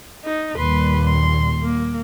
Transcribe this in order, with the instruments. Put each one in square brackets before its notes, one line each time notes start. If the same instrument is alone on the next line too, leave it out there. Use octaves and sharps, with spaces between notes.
[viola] D#4
[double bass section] D#2 A#2 G3 [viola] B4 C6
[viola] C6
A#3